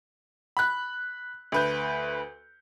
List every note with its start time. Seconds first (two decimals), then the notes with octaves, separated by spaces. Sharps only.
0.57 B5 F#6
1.52 D2 B4 G6